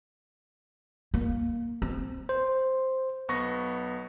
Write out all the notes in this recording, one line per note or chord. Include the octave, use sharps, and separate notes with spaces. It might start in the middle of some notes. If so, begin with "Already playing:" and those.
A#3
C4
C5
B1 B3 C#6 A#6